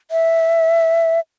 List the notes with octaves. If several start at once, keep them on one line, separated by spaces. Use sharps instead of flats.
E5